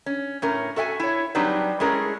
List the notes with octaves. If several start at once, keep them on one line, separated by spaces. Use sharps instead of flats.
C#4
A2 C#4 A#4
F#4 A4 E5 G5 G#5
E4 C#5
F#3 G3 C4 D4 D#4 B4
G#3 A3 C#4 E4 G#4 A#4